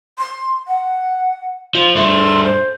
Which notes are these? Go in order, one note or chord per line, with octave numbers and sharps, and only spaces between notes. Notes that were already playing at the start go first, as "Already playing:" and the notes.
C6
F#5
F3 F4
G2 A3 C6
C5